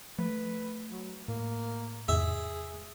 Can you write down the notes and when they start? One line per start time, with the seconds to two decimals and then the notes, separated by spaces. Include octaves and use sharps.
0.19 F3 A3 B4
0.91 F#3
1.28 A2 A#3
2.08 E2 G#2 C3 G#4 E5